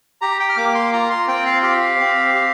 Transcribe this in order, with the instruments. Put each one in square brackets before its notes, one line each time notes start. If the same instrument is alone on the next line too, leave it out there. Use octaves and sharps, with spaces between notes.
[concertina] G4 A#5
G5
F6
A#3 D6
C6
F4 A#5
C6
C4 G5
F5
G4 F5
C4
G4